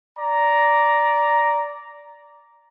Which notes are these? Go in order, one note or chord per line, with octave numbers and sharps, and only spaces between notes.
D5 A#5